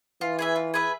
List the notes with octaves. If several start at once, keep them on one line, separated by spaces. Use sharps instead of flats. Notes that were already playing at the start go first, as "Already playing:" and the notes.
E3 F4
G#4 B4 E5
F4
G#4 B4 E5